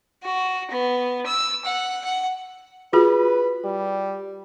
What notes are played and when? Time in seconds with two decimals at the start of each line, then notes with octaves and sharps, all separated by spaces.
0.23 F#4
0.71 B3
1.26 E6
1.65 F#5
2.04 F#5
2.93 F4 F#4 G#4 B4
3.64 G3